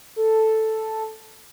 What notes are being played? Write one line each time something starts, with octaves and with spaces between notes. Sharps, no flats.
A4